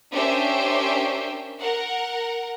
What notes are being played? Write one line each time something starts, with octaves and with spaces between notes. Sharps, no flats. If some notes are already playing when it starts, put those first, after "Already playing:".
C#4 D4 G4 A#4 C5 E5
A#4 F#5